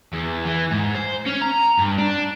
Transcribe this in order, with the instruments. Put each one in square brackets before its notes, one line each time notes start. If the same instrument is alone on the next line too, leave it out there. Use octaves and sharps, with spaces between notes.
[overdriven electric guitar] E2
E3
G#2
C5
C#4
A#5
G2
D4